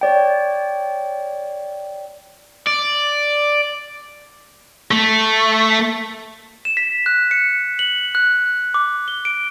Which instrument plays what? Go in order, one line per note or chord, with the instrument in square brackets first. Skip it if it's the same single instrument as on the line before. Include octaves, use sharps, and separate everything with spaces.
[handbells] C#5 D5 G5
[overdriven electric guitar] D5
[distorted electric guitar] A3
[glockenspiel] E7
B6
F#6
C#7
F#7
F#6
D6
G7
D7